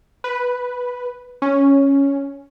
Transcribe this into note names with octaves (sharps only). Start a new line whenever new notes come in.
B4
C#4